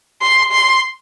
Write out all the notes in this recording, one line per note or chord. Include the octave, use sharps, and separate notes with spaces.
C6
C6